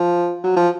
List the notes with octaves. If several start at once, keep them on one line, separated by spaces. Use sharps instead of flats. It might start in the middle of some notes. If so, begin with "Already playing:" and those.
Already playing: F3
F#3
F3